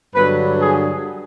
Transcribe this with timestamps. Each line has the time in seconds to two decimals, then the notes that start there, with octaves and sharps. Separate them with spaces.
0.15 G2 D3 F#3 B4
0.60 G#4